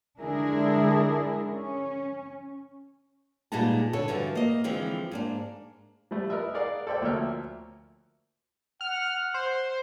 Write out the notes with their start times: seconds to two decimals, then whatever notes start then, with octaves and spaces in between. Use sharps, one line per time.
0.21 D3 G#3 D4 E4 G#4 A#4
1.49 C#4
3.52 A#2 G3 G#3 B3 D#4 A5
3.93 D3 A4 C#5
4.08 G2 D3 E3 F3 F#4
4.35 A#3 D#5
4.64 D3 E3 F3 G#3 C4
5.11 G#2 A#3 D4
6.11 F3 G3 A3
6.30 A#4 B4 D#5 E5
6.54 G#4 A#4 D5 F5 F#5
6.87 A4 C5 D5 E5 G5
7.02 D2 F3 A#3 C#5 E5 F6
8.81 F#5 F6
9.34 C5